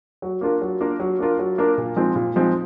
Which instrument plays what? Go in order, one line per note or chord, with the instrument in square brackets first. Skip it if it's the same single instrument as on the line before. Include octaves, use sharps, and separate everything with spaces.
[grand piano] F#3
A#3 D4 F4 A#4
F#3
A#3 D4 F4 A#4
F#3
A#3 D4 F4 A#4
F#3
A#3 D4 F4 A#4
A#2
F3 G#3 C4 D#4
A#2
F3 G#3 C4 D#4